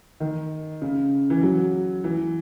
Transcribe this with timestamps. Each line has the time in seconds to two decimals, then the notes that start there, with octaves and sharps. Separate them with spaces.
0.20 D#3
0.82 C#3
1.30 E3
1.43 F#3
2.04 E3